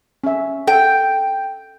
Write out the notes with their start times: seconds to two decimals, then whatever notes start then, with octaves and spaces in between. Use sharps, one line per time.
0.24 C#4 E5
0.67 A4 F#5 G5